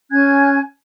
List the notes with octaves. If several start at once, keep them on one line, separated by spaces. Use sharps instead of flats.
C#4 G#5 F#6 G#6